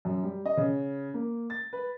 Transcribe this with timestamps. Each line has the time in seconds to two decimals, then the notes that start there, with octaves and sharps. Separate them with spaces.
0.05 F#2
0.23 G3
0.46 D#5
0.57 C#3
1.14 A#3
1.50 A6
1.73 B4